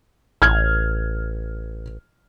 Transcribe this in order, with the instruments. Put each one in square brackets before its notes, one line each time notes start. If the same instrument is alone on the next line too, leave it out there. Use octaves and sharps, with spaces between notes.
[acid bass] A1 [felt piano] F6 G#6